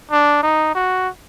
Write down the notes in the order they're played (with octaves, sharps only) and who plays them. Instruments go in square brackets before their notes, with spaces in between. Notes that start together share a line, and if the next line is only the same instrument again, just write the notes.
[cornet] D4
D#4
F#4